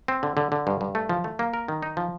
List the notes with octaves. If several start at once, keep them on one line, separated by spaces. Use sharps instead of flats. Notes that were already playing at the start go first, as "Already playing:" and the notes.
C4
D3
D3
D3
G2
G2
A3
F3
A3
A#3
A#4
D#3
D#4
F3